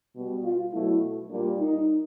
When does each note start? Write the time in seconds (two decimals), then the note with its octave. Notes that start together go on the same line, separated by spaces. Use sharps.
0.15 B2 G3 B3
0.44 F4
0.73 B2 F#3 A3 E4
1.30 A#2 G3 A#3 D4
1.59 D#4